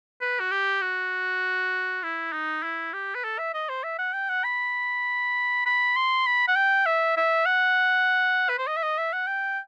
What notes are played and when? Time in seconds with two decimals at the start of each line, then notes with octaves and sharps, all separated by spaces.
0.21 B4
0.40 F#4
0.52 G4
0.82 F#4
2.03 E4
2.33 D#4
2.63 E4
2.94 G4
3.15 B4
3.24 A4
3.39 E5
3.54 D#5
3.69 C5
3.84 E5
3.99 F#5
4.14 G5
4.30 F#5
4.45 B5
5.66 B5
5.96 C6
6.26 B5
6.48 F#5
6.56 G5
6.86 E5
7.17 E5
7.46 F#5
8.50 B4
8.58 C5
8.67 D#5
8.77 E5
8.83 D#5
8.98 E5
9.13 F#5
9.27 G5